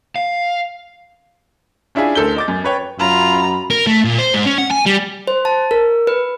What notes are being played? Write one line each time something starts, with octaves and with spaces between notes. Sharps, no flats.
F5
C#4 D4 E4 F4 G#4
D2 A4 A#4 G6 G7
D#5 D6 A6
F#2
B4 C#5 G5
F#2 F4 A#5 B5
A#4
A3
A#2
C5
G#2
C#4
F#5
G#5
G3
C5
A5
A#4
B4